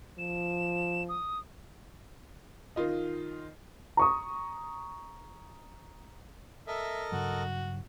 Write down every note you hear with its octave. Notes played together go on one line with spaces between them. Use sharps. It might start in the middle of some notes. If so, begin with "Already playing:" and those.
F3 E7
D#6
D#3 F4 D#5
A#5 C#6 D#6
A4 A#4 D#5 E5
G2 C#3 F#3 F#4